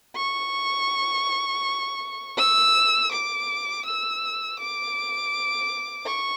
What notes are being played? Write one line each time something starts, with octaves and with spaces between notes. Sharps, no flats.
C#6
E6
D6
E6
D6
C#6